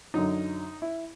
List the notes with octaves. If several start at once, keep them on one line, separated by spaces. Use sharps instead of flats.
F#2 D3 F#3 D#4
E4